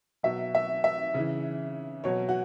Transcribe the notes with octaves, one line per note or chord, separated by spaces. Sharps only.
B2 F#3 E5
E5
E5
C#3 E3
B2 F#3 C#5
F#4